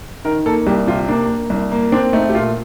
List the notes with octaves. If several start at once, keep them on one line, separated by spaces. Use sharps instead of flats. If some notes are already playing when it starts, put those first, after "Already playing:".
D#3 A#4
A#3 A4
C2 G4
C3 F4
A#3 D4
A#3
C2
A#3
C4 D4
A3 D#4
G4
A#2 F4